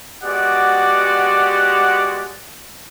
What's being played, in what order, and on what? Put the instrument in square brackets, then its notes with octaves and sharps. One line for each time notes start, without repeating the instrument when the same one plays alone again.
[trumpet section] G#3 B3 F#4 G4 D5 F#5